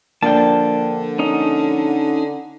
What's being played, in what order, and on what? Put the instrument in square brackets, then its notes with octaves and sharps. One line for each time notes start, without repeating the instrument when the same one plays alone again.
[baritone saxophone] D3 [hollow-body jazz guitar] F3 A#3 D4 [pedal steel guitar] G5 A5
[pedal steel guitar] C#4 D#4